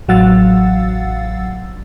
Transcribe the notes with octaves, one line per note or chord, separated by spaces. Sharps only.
A1 F#3 F5 F#5 E6 A6